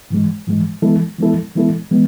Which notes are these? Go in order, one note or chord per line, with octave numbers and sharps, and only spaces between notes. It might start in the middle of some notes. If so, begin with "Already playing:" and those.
G#2 E3 G#3
G#2 E3 G#3
E3 G#3 B3 E4 A4
E3 G#3 B3 E4 A4
E3 G#3 B3 E4 A4
E3 G#3 B3